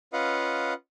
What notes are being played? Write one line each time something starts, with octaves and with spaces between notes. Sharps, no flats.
C#4 F4 B4 D#5 F5 F#5